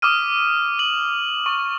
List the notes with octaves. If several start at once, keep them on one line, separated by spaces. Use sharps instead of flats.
D6 D#6 F6 D#7
F#7
C#6